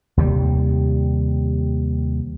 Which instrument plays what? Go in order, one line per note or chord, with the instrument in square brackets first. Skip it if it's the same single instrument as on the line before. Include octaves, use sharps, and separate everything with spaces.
[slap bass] D#2 C3 G3